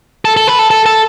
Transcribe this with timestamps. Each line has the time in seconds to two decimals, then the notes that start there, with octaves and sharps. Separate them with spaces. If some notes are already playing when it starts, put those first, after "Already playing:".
0.25 A4
0.37 A4
0.48 B4
0.59 A4
0.71 A4
0.86 A4